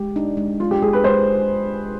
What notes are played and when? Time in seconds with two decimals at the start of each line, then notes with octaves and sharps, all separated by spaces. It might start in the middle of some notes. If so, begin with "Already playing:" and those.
Already playing: G#3 G4
0.16 D4 D#4
0.37 G#3
0.60 G#3 F4
0.71 G4
0.82 G#3 G#4
0.93 B4
1.04 G#3 C5